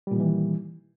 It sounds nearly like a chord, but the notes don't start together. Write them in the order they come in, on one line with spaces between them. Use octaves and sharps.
G3 A#2 D#3 E3